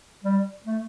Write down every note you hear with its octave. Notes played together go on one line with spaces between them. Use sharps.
G3
A3